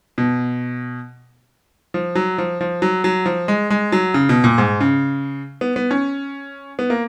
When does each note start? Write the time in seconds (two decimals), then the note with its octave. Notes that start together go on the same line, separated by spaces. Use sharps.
0.18 B2
1.94 F3
2.16 F#3
2.38 F3
2.61 F3
2.82 F#3
3.04 F#3
3.26 F3
3.48 G#3
3.70 G#3
3.92 F#3
4.14 C#3
4.29 B2
4.44 A#2
4.58 G#2
4.80 C#3
5.61 B3
5.76 B3
5.91 C#4
6.79 B3
6.90 A#3